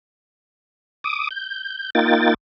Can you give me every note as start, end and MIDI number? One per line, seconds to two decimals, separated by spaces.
1.04 1.29 86
1.04 1.29 87
1.31 1.90 91
1.95 2.34 58
1.95 2.34 63
1.95 2.34 65
1.95 2.34 79
1.95 2.34 93